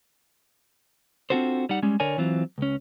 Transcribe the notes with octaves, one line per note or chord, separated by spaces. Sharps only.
C4 D4 F4 F#4 A4 C5
G3 D#4 F#5
G3 G#3 C#4
D3 A#4 C#5 D5 G#5
E3 F#3 C4 F4
C#2 C#4